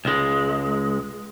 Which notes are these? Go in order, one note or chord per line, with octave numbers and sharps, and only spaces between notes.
C#2 G#3